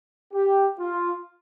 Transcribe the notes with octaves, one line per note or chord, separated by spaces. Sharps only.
G4
F4